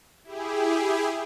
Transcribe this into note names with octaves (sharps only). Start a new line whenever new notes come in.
E4 G4 G#4